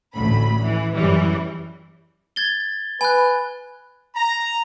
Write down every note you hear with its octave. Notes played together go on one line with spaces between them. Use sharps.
A1 D2 B5
E3
F#2 E3 G3
G#6 A6 G7
B4 G#5 F#6
A#5